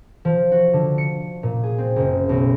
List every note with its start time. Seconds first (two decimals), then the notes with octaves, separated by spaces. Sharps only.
0.25 F3
0.51 F#4
0.73 D3
0.98 C#7
1.43 A#2
1.63 G#4
1.78 C4
1.96 F#1
2.29 B1